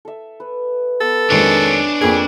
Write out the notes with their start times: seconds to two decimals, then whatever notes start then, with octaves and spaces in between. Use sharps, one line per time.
0.05 A4 E5
0.40 B4
1.01 B3 A4
1.30 F2 D#3 G#3 D4 G4 C#5 G#5
2.01 F2 A#3 G#4